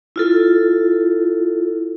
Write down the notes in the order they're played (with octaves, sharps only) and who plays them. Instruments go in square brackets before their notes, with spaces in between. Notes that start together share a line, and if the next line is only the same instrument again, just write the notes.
[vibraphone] E4 F4 A4